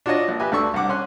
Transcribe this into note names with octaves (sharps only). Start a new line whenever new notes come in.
D4 F4 F#4 C#5 D#5
A#1
G4 B4 E5 G#5
D2 D3 D5 C#6 E6
C2 D4 F#5 D6
C#4 C6 F#6